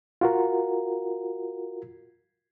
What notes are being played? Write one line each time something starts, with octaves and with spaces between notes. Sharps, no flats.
F4 F#4 A#4